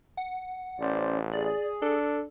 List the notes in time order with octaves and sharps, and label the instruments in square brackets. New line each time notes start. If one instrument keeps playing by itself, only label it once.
[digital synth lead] F#5
[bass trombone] A1 [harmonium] C#4 C5 D5
[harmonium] G#4 [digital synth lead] D5
[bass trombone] D4 [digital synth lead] A4